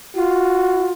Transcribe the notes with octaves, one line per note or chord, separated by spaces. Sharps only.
F4 F#4